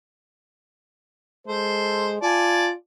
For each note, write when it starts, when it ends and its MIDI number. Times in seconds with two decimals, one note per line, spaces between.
1.47 2.19 56
1.47 2.15 69
1.47 2.15 72
2.22 2.74 65
2.22 2.68 74
2.22 2.68 80
2.22 2.68 81